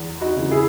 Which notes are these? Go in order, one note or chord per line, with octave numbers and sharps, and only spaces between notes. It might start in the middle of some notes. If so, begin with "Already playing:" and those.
Already playing: E2
D#4 F#4
C#3 E3
E4 G#4